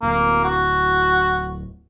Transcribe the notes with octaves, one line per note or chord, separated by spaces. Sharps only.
D1 A#3
F#4